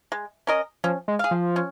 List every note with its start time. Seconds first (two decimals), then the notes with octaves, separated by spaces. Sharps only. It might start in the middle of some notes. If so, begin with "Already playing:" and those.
0.12 G#3
0.47 C#4 A#4 D#5
0.84 F3 C#4
1.08 G#3
1.19 G#4 F5
1.31 F3
1.56 C#4